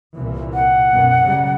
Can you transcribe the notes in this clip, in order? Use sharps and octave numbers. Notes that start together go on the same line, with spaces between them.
C2 A#2 E3
F#5
F#2 B2 B3
C#3 F#3 G3